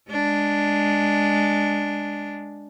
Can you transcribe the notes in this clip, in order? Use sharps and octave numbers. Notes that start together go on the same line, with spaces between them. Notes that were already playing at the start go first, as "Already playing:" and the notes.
G#3 D4